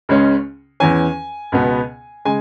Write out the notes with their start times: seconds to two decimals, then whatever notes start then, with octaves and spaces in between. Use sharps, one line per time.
0.09 C#2 C#3 G#3 C#4
0.80 E2 E3 C#4 G#5
1.52 C#2 B2 B3
2.25 C#3 G#3 G#5